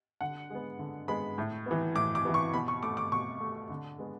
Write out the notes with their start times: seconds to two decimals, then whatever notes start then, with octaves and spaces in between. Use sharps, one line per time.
0.21 D3 F#5
0.50 G#3 B3
0.79 D3
1.08 G#3 B3 B5
1.38 A2
1.66 E3 B3
1.95 A2 D6
2.15 D6
2.25 E3 B3
2.34 C#6
2.53 B2 B5
2.68 C#6
2.83 A3 D6
2.97 D6
3.12 B2 C#6
3.40 A3
3.70 D3
3.99 G#3 B3